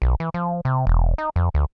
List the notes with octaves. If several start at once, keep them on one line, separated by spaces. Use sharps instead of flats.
B1
E3
F3
C3
E1
D#4
F2
D2